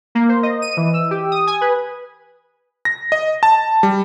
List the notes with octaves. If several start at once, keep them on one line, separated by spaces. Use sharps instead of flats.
A#3
C5
D#5
D#7
E3
E6
G4
D#6
G#5
B4
A#6
D#5
A5
G3